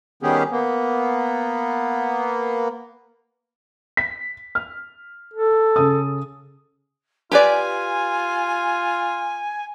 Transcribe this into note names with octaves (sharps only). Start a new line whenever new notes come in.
D#3 G3 B3 C#4 G4 G#4
A#3 B3
B6
F6
A4
C#3 D#6
F4 G4 B4 D5 G#5